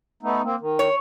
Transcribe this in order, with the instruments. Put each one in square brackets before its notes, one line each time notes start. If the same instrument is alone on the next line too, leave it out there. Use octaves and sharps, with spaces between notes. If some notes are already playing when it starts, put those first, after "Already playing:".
[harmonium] A3 B3 D#4
A#3 C4
D#3
[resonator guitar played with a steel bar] C#5